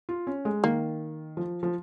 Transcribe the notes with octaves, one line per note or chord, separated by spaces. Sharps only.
F4
C#4
G#3
D#3 A#3
F3
F3